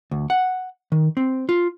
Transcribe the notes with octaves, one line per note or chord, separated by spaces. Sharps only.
D2
F#5
D#3
C4
F4